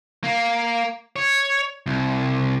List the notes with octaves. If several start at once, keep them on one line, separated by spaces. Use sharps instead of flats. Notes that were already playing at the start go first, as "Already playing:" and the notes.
A#3
C#5
C2